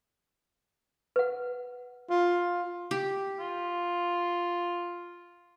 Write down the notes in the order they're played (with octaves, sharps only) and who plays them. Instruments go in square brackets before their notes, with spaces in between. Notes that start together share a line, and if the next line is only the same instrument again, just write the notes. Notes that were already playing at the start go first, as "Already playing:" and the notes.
[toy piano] B4 F#5
[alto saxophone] F4
[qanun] G4
[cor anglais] F4